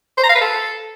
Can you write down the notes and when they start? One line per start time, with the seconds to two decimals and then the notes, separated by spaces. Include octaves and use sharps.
0.18 C5
0.23 A#5
0.29 F5
0.35 B4
0.41 A4